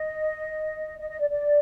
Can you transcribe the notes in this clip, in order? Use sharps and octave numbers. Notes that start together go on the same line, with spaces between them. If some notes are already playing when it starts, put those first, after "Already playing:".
Already playing: D#5
D#5
D#5
D5
D5